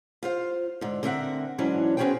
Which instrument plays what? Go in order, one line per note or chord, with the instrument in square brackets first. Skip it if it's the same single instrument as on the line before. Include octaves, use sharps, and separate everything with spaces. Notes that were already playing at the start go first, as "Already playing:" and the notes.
[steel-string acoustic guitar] F4 C5 F5
G#2 D3
D3 C4 A#4 E5 F#5
G#2 E3 F#3 C#4 D4
B3 C#4 F#4 G#4 C5 G5